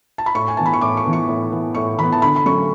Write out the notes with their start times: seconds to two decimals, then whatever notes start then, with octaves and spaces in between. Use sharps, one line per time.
0.18 A5
0.26 B5
0.35 A2 C#6
0.48 G#5
0.57 E3 B3 A5
0.66 B5
0.73 C#6
0.81 A2 D6
0.97 C#6
1.05 E3 B3
1.13 C#6
1.28 A2
1.52 E3 B3
1.75 A2 C#6
1.99 E3 B3 B5
2.12 A5
2.22 D3 B5
2.36 B5
2.45 F#3 A3 C#4 C#6